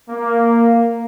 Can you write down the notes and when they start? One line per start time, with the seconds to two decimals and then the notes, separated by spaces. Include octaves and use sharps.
0.10 A#3